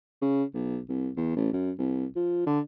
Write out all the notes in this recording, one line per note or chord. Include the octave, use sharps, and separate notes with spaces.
C#3
B1
C2
E2
A1
F#2
C2
F3
D3